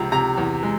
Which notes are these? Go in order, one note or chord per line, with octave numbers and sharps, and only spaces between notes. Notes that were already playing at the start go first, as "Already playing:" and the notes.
Already playing: C#2 C3 F3 A#5
C3 A#5
E2
G#3